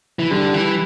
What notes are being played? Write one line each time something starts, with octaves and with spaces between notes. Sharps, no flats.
E3
D3 G3
E3